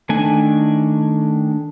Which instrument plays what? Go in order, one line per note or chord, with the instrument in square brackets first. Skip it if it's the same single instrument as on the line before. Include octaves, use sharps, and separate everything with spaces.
[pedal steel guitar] D#3 A3 D4 G#5